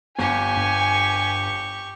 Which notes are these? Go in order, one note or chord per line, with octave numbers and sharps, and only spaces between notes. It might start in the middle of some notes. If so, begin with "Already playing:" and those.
G1 B3 G4 G#5 C#6
G2